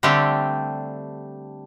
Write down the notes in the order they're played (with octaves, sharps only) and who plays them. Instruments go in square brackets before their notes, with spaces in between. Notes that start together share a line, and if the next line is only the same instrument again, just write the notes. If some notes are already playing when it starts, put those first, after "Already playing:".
[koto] D3 G3 A3 C4 D4 G4